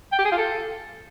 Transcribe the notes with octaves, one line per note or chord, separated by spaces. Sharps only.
G5
G4
G#4
F4
A4